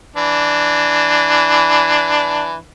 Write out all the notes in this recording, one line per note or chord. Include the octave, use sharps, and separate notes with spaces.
E3 D4